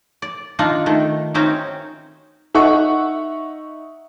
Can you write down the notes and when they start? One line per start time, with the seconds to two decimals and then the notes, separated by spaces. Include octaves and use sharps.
0.22 D5
0.59 D#3 D4 D#4 F4 F#5
0.86 D#3 A3
1.34 D#3 C4 C#4 D#4 F#4
2.55 D#4 E5 F#5 C#6